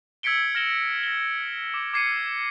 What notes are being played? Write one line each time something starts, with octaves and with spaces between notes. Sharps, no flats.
E6 G#6 B6 C#7 D7 G7
F6 A#6 E7 G7
A#6 G7
D6
D6 G#6 C7 C#7 D#7